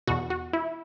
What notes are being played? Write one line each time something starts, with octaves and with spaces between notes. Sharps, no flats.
E2 B2 F#4
F#4
E4